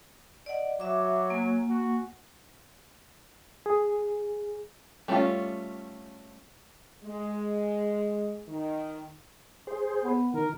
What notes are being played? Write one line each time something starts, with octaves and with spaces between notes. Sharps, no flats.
D5 D#5 F#5
F#3 F#4 E5 D6
A#3 G#5
F#4
G#4
G3 A3 C#4 D#4 F4
G#3
D#3
G#4 C5
B3
D#3 A#4